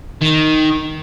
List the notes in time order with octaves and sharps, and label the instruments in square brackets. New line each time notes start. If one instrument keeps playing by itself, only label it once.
[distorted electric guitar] D#3